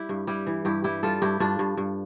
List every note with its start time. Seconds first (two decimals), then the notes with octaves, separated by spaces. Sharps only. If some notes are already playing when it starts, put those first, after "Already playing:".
Already playing: G3 E4 G4
0.09 G2
0.27 G3 E4 G4
0.47 E3
0.65 G2 E4 G4
0.84 G3 E4 G4
1.03 G3 F4 A4
1.22 G2 E4 G4
1.40 G2 D4 F4
1.59 G2
1.77 G2